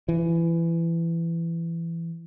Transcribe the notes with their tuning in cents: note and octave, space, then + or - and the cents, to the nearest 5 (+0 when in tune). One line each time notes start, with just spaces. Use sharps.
E3 +20